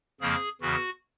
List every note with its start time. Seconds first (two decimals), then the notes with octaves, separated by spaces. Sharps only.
0.21 F2 C#3 F3 A#3 G#4
0.61 E2 C#3 E3 F#4